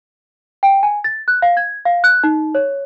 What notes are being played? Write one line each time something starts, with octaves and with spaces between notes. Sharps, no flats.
G5
G#5
A6
F#6
F5
G#6
F5
F#6
D#4
C#5